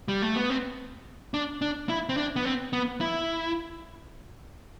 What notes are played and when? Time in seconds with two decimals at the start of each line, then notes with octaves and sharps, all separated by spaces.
0.08 G3
0.22 A3
0.36 B3
0.50 C4
1.34 D4
1.62 D4
1.89 E4
2.09 C4
2.17 D4
2.36 B3
2.45 C4
2.73 B3
3.01 E4